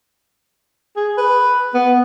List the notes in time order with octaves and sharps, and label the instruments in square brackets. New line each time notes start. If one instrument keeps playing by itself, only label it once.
[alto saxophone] G#4
B4
B3